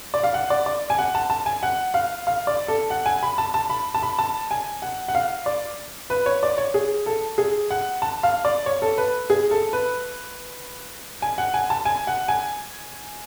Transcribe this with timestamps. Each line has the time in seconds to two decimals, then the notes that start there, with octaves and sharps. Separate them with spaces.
0.14 D5
0.24 F5
0.34 F#5
0.50 D5
0.66 D5
0.90 G#5
0.98 F#5
1.15 A5
1.30 A5
1.46 G#5
1.63 F#5
1.94 F5
2.27 F5
2.47 D5
2.68 A4
2.90 F#5
3.06 G#5
3.23 B5
3.38 A5
3.54 A5
3.70 B5
3.94 A5
4.03 B5
4.19 A5
4.51 G#5
4.82 F#5
5.08 F#5
5.15 F5
5.46 D5
6.10 B4
6.26 C#5
6.43 D5
6.58 C#5
6.74 G#4
7.06 A4
7.38 G#4
7.70 F#5
8.02 A5
8.23 F5
8.45 D5
8.66 C#5
8.82 A4
8.98 B4
9.30 G#4
9.51 A4
9.73 B4
11.22 G#5
11.38 F#5
11.54 G#5
11.70 A5
11.85 G#5
12.07 F#5
12.28 G#5